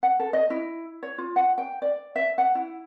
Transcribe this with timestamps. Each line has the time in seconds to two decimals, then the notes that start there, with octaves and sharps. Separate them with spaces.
0.03 F#5
0.19 A4
0.33 D#5
0.50 E4
1.03 C#5
1.18 F4
1.36 F#5
1.58 G5
1.82 D5
2.16 E5
2.38 F#5
2.55 E4